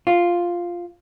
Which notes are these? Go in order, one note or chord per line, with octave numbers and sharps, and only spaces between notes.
F4